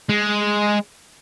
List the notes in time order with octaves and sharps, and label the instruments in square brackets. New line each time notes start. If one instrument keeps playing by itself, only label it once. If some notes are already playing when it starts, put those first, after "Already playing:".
[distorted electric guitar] G#3